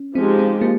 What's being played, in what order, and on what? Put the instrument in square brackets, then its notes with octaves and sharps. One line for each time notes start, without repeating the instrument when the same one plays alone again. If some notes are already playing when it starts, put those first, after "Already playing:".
Already playing: [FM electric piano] C#4
[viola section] F3 G#3 D#4 G4 [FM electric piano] C4
[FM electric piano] C4
A#3